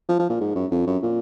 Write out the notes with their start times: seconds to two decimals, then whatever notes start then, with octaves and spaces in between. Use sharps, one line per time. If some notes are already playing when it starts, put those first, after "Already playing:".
0.09 F3
0.19 F3
0.30 A#2
0.40 G#2
0.55 F#2
0.71 F2
0.87 F#2
1.03 A#2